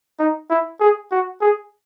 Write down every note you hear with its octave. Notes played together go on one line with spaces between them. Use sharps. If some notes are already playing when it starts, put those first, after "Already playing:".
D#4
E4
G#4
F#4
G#4